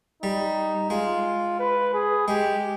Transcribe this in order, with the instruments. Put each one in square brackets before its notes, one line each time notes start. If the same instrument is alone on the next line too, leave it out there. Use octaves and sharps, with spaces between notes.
[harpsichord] G3 [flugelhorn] D#4
[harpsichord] G#3 [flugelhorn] F4
[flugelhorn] B4
G#4
[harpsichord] G#3 [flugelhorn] G4